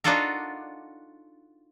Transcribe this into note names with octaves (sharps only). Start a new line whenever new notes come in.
D4 D#4 F4 F#4 A4 A#4